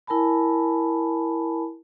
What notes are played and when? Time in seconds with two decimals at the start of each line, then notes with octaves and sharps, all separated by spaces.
0.07 E4 A#4 G#5 A5 B5